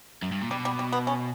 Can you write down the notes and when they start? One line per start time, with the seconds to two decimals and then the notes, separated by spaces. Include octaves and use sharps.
0.22 F#2
0.32 G2
0.42 A#2
0.51 B2 G3
0.65 G3
0.79 G3
0.93 B3
1.07 C#4